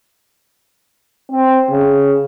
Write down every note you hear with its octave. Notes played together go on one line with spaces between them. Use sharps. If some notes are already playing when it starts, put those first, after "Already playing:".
C4
C#3